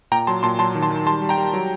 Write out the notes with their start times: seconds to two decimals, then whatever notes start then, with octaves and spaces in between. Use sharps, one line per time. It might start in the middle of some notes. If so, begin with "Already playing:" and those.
0.12 A#2 G5 A#5
0.27 F#3 A5 C6
0.43 A#2 A5 C6
0.59 F#3 A5 C6
0.75 D#3
0.83 A5 C6
0.90 D#3
1.06 G3 A5 C6
1.22 G3
1.29 G5 A#5
1.38 G3
1.53 F#3